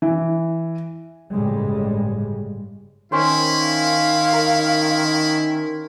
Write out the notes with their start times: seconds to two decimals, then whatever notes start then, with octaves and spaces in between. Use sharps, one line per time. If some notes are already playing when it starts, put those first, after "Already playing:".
0.02 E3
1.33 G1 A2 C#3 G3 G#3
3.12 D#3 C#4 E4 C5
3.64 F5
4.33 A#4